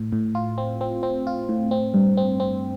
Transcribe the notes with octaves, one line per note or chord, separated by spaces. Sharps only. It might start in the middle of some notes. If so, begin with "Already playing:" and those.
Already playing: A2
A2
F4
C4
C4
C4
F4
A2
C4
G2
C4
C4